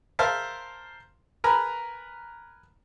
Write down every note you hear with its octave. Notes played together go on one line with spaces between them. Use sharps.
A#4 C5 E5 F5 A5 C6
A#4 B4 G#5 A#5 B5